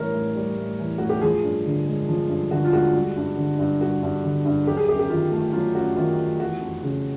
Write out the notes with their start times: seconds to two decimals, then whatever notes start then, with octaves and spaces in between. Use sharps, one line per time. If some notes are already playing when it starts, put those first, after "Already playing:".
Already playing: A2 E3 G3 A#4 C#5
0.14 A2
0.36 G3
0.57 A2
0.79 E3
0.98 A2 F#4
1.09 G4
1.21 F3 G#4
1.43 G2
1.66 D3
1.87 G#3
2.08 F3
2.29 G2
2.51 D3 F#4
2.64 F4
2.73 G#3 F#4
2.94 G3
3.17 G2
3.37 D3
3.58 G2
3.81 G3 F#4
4.03 G2
4.24 D3
4.45 G2
4.67 F#3 G4
4.77 G#4
4.89 F#2 G4
4.99 G4
5.09 D#3 F4
5.31 A3
5.53 F#3 F4
5.75 F#2 F#4
5.96 D#3 F4
6.18 A3
6.40 E3 F#4
6.61 F2
6.83 C#3